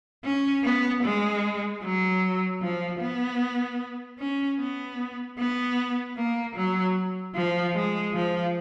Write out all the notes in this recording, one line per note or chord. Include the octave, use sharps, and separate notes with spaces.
C#4
B3
G#3
F#3
F3
B3
C#4
B3
B3
A#3
F#3
F3
G#3
F3